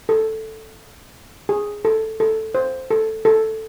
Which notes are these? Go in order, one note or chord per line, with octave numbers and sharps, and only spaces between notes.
A4
G#4
A4
A4
C5
A4
A4